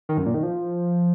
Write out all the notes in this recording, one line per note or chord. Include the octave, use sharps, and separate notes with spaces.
D#3
F#2
A#2
D#3
F3